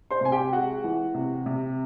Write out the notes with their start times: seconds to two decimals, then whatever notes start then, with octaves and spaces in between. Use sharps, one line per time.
0.11 C5 C6
0.21 C3 G#5
0.32 G4 G5
0.53 G#3 F#4 F#5
0.84 E3
1.14 C3
1.46 C3